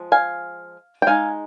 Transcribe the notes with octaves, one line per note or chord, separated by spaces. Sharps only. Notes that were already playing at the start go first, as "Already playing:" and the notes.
Already playing: F3 G#3
F5 G#5
G5
G#3 D#4 F5 G#5